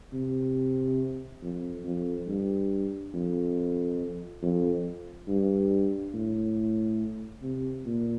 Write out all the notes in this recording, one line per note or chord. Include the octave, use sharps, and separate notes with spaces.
C3
F2
F2
G2
F2
F2
G2
A2
C3
A#2